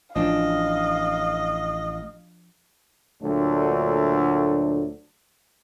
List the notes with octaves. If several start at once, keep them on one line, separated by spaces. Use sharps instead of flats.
A1 F3 D4 D#5 F5
D2 A#2 F#3 A3 D4